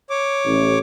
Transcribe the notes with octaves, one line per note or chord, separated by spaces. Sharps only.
C#5 D6
A1